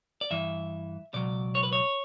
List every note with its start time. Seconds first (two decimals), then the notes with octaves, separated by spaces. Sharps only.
0.21 D5
0.31 G2 E3 E5
1.14 C#2 B2 F#3 D5
1.55 C#5
1.63 B4
1.73 C#5